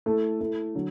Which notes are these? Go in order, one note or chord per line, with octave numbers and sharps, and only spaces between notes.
A3 E4 A4
A3 E4 A4
D3 F#3